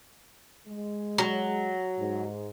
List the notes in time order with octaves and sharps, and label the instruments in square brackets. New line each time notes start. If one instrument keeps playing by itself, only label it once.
[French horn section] G#3
[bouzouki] F#3
[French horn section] G#2